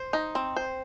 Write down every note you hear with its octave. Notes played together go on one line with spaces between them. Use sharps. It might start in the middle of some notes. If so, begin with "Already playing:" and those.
Already playing: C5
D#4
C4
C5